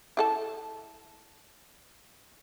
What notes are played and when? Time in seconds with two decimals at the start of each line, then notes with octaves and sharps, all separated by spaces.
0.17 E4 A4 A5